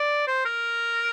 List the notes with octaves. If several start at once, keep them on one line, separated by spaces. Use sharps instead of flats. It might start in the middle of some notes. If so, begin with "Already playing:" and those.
Already playing: D5
C5
A#4